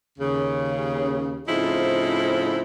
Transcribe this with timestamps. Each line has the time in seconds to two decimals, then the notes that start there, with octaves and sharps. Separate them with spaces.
0.19 D#2 C#3
1.48 A2 C#3 F3 C4 D#4 E4